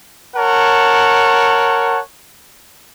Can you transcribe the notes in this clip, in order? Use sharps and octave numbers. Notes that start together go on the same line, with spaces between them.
A#4 C#5 F#5 A5